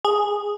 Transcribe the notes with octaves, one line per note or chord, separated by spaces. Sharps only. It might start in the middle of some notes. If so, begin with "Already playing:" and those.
G#4